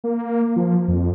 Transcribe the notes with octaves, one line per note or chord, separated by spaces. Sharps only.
A#3
F3
F2